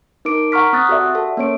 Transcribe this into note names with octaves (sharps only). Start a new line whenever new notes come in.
D#4 A#4 D6 D7
F#5 A#5 C#6 F6 B6
C4 D#6 F#6 A6
F#4 G4 A4 D5 E5 F#5
A4
A#3 C#4 C#5 D7